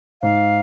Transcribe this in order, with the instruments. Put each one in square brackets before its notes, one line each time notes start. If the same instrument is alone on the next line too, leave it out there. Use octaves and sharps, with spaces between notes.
[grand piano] G#2 [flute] F5